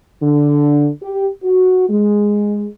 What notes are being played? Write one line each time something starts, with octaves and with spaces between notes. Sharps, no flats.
D3
G4
F#4
G#3